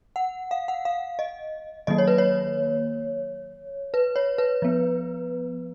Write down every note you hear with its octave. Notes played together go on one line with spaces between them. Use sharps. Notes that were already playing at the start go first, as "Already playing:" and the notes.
F#5
F5
F#5
F5
D#5
D#3 F#3 A#3 D#5
C#5
B4
C#5
B4
C#5
B4
F3 B3